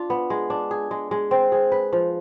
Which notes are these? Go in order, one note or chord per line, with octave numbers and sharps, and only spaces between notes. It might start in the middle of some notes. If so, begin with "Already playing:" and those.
Already playing: D4 F4
B3
G#3
D4
G#4
G#3
G#3
C4
G#4
B4
F3